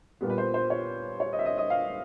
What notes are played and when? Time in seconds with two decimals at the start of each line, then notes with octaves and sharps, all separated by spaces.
0.21 A#2 G3 B3
0.30 B4
0.38 C5
0.54 C5
0.70 C#5
1.20 C#5
1.33 D#5
1.39 E5
1.45 D#5
1.58 D#5
1.70 F5